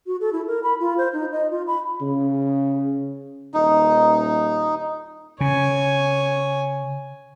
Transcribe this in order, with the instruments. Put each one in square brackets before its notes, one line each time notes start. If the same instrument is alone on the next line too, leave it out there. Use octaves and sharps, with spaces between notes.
[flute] F#4
A4
E4
A#4
B5
F4
C5
D#4
D#5
F4
B5
[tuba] C#3
[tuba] D#1 [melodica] D#4
[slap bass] C#3 [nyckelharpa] C#5 G#5